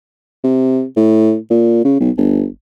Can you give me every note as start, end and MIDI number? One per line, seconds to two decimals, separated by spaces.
0.44 0.84 48
0.96 1.36 45
1.50 1.81 46
1.84 1.98 49
2.00 2.10 35
2.17 2.46 31